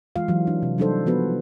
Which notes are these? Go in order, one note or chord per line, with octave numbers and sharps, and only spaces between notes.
E3 G#3 F4 F5
E3 F#3
D4
C3
F#3 G3 D4 D#4 A4 C5
F3 B3 F#4 B4